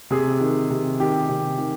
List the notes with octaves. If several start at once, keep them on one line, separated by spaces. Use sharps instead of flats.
C3 G#4
D#3
C3
D#3 G4
C3
D#3